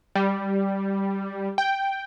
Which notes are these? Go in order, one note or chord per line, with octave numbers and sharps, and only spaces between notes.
G3
G5